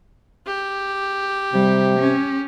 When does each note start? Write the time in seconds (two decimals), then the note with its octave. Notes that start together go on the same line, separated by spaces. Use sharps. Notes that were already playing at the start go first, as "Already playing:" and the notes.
0.47 G4
1.53 C3 G3
2.00 C#4